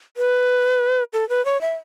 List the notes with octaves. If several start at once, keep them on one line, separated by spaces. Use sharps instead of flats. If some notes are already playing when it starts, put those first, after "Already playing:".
B4
A4
B4
C#5
E5